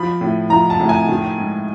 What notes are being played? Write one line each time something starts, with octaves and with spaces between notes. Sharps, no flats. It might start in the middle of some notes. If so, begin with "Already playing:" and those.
Already playing: F3 B5
A2
F3 A#5
A5
A2
G#5
D#3
G#2